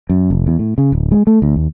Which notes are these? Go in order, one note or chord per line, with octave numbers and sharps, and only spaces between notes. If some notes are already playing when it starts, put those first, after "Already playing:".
F#2
F1
E2
A2
C#3
D1
G#3
A3
D2
D#2